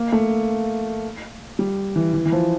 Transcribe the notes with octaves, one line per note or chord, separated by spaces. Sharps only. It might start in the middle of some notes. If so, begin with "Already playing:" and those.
Already playing: A#3
A3
G3
E3
E3
E3
F3